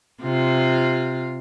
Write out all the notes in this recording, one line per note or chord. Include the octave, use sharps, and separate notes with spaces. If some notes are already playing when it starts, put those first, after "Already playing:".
C3 F4